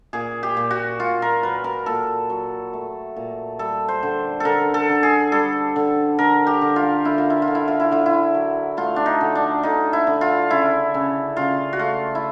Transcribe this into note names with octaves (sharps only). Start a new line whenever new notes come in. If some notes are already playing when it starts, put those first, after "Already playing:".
A#2 G#4
G4
A#2
F#4
A#2 F4
A#4
F#3 B4
A#4
A#2 A4
F#3
A3
A#2
G3 A4
C5
D3
D3 A4 A#4
A4
D3
G#4
G3 A4
D3
D3 A#4
G4
D3
F4
D3 E4
F4
E4
F4
D3
E4
F4
E4
D3 F4
E4
F#3
A3 F4
D4
D#4
D3
D4
D3 D#4
E4
D3
F4
C#3 E4
C#3
C#3 F4
F#4
A3 F4
E4